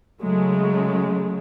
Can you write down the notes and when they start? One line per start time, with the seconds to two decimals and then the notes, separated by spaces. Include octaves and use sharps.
0.21 C#3 F#3 G#3 A3